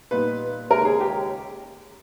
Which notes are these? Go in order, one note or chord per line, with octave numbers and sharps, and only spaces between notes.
A#2 G3 B3 D#4 B4
D#2 C#3 G#3 C#4 A#4
G#4
G4